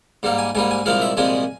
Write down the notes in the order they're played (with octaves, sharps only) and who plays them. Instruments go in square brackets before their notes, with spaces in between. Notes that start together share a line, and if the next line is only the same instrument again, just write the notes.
[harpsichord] G#2 G3 A#3
G#5
G#2 G3 A#3 G#5
G#5
C2 A#2 F3 G#3 F5
E5
C2 A#2 F3 G#3 G#5